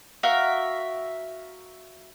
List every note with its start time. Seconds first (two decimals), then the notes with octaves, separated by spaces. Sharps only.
0.23 F#4 A#4 E5 F5